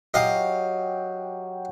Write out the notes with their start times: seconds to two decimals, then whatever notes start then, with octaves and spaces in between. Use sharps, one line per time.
0.14 F#3 G4 D#5 F5